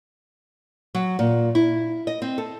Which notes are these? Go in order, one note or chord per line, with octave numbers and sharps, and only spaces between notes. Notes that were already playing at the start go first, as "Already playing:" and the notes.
F#3
A#2
E4
D#5
C4
A4